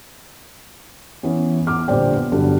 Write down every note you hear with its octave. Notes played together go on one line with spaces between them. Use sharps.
E3 B3 C#4
E2 D6 F6
A#1 D3 G3 C5 D5 G5
B3
G1 D3 F#3 G3